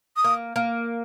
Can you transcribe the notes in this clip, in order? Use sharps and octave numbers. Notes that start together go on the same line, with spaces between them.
D#6
A#3
A#3